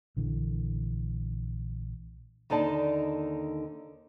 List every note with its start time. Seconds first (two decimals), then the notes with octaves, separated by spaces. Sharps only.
0.17 A#1 D3 E3
2.50 D#2 D3 D#4 D5 A5